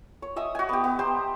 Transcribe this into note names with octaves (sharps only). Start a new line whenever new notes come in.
C#5
D#5 E5 G#5 D#6
F#4 G#5
B3 G4
B3
G4 C5 A#5 C6